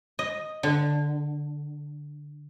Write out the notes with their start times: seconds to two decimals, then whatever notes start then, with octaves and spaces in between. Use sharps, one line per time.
0.19 D#5
0.63 D3